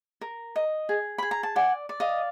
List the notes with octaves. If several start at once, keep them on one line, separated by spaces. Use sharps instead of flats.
A#4
D#5
G#4
G#4 B5
A#5
A5
D5 F#5 G#5
D5
D#5 F5